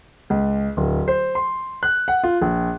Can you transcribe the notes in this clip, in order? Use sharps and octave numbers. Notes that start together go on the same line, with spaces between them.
C#2
D1
C5
C6
F#6
F#5
F4
A#1